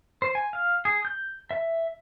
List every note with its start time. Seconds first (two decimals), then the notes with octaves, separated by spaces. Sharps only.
0.22 C5
0.35 G#5
0.53 F5
0.85 G#4
1.05 G6
1.51 E5